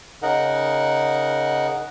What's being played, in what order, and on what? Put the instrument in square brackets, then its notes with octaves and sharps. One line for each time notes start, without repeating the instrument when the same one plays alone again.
[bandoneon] C#3 D#4 A#4 F#5